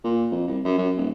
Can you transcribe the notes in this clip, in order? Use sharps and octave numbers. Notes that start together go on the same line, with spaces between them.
A#2
F2
C2
F#2
F#2
D#1